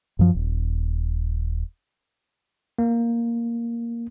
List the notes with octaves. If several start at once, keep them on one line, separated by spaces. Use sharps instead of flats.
F#2 F3
D#1
A#3